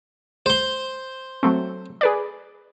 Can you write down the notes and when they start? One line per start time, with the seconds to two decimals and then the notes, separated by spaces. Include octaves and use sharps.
0.46 C5 C6
1.43 F#3 A3 C4
2.01 G#4 B4 D5